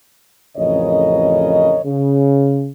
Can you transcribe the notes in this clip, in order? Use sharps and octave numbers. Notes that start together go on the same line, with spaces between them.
A1 F2 C#3 A#4 C#5 D#5
C#3